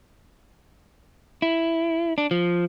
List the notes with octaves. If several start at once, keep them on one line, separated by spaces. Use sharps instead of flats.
E4
D4
F3